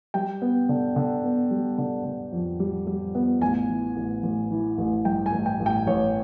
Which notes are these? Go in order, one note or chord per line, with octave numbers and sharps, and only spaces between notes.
G3 G5
B3
D3
D3
B3
G3
D3
D3
F2
G3
G3
B3
A1 G#5
E3
A1
A1
E3
A1
G2 G5
G#5
A1
G5
A1
G5
A1 C#5